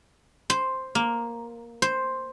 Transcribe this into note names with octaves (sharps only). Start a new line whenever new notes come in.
C5
A#3
C5